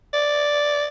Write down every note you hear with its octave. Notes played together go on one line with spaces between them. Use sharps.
D5